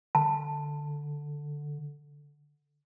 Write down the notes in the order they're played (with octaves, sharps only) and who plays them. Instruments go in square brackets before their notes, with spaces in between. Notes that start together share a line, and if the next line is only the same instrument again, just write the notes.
[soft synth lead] D3 [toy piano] A5